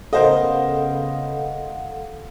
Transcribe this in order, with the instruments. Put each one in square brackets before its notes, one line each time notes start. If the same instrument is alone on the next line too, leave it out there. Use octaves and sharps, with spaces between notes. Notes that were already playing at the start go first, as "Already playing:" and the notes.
[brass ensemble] C#3 B3 [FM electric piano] A4 F5 F#5 [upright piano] A#4 C5 D#5